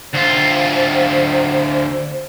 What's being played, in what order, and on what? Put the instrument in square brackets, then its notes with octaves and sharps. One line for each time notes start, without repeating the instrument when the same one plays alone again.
[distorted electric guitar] D2 F4 [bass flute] C5